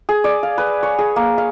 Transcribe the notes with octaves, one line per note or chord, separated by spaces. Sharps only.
G#4
D5
F5
B4
C#5
G#4
A#3
F5